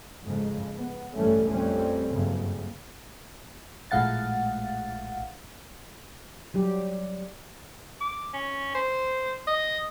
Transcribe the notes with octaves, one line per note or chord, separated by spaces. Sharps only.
F2 G#2 C#3 G#3
B3
A1 G2 E3 G3 A3 C#4
F2 G3 A3 C4 C#4
F#1 G2 C#3
A#1 A2 G#3 F5 F#5 A6
F#3 G3 G4
D6
C#4
C5
D#5